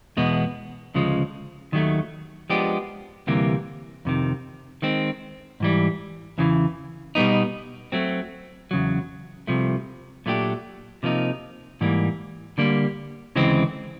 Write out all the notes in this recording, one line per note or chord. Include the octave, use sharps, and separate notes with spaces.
E2 B2 G#3 B3
D2 C#3 F3 G#3
D#2 D#3 F#3 A3
F3 G#3 B3 D4 G4
D2 C3 E3 G3 A#3
F2 C3 D#3
D#3 G#3 C4
G#2 E3 G3
E2 C#3 E3
B2 G3 B3 D#4
F#3 A3 C4
E2 C#3 F#3
C2 C3 F3 A3
A#2 F#3 A3 D4 G4
C3 F3 A#3 D#4
G#2 E3 G3 A#3
D3 G3 A#3
D2 C#3 E3 G#3 C4